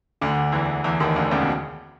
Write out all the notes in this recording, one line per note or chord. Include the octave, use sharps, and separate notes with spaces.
D2 D3
E2 E3
E2 E3
D#2 D#3
D2 D3
C#2 C#3
B2